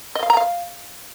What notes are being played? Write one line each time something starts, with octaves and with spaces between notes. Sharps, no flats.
D#5
F5
A#5
F5